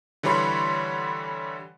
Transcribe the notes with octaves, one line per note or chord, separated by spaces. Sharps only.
D3 E3 G3 C#5 B5 C6